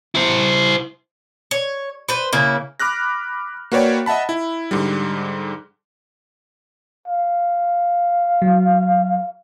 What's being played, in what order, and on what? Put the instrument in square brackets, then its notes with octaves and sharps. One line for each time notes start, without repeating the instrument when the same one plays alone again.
[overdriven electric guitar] E4 C5
[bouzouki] C#5
B4 C5
C#3 A#3 E4
[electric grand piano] B5 D6 F6 F#6 A#6
A#3 F#4 B4 C#5 D5 G5
D#5 E5 F#5 A5 B5
E4
G#2 D3 G3
[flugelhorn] F5
[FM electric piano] F#3